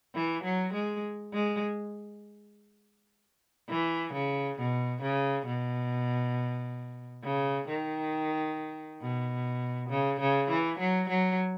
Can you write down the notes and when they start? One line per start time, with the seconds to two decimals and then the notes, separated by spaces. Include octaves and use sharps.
0.15 E3
0.44 F#3
0.74 G#3
1.33 G#3
3.69 E3
4.14 C#3
4.59 B2
5.02 C#3
5.46 B2
7.24 C#3
7.68 D#3
9.02 B2
9.90 C#3
10.20 C#3
10.50 E3
10.79 F#3
11.09 F#3